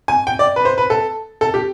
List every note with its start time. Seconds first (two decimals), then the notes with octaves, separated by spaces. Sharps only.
0.08 G#5
0.27 G5
0.39 D5
0.56 B4
0.65 C5
0.78 B4
0.90 A4
1.41 A4
1.54 G4